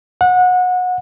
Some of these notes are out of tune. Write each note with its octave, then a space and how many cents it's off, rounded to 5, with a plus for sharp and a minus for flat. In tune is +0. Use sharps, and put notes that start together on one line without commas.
F#5 -25